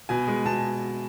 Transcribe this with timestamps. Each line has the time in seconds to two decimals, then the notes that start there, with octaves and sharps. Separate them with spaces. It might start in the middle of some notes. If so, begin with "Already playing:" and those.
0.09 B2 G#5
0.28 G#3
0.45 B2 A5